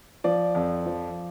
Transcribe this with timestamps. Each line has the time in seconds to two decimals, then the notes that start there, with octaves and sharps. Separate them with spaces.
0.24 F3 D5
0.55 F2
0.86 F3